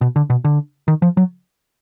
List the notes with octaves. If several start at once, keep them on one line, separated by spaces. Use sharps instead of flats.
B2
D3
B2
D3
D#3
F3
F#3